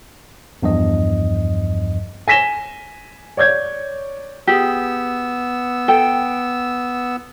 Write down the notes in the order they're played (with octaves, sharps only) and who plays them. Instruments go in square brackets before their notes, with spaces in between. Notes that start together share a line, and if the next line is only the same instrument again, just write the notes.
[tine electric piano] E2 G2 F3 D#5
[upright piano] G#5 A#6 B6 E7 G7
C#5 D5 G6 G#6
[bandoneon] B3 E6 [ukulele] G4 G#4
[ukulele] A4 G5